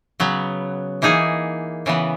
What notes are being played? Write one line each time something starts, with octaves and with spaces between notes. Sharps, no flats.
C#3 F#3 B3
E3 A#3 D#4 G#4
C#3 E3 B3